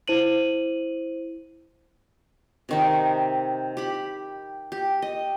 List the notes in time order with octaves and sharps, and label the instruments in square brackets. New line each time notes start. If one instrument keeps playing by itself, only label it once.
[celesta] E4 C5 D#7 F#7
[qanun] C3 D#3 D#4
G4 B5
G4
D#5